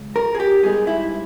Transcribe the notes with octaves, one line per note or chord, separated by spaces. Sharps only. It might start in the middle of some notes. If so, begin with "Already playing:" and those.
Already playing: C#2
A#4
G#4
G4
G#2 G3 B3 D#4 G#4
E4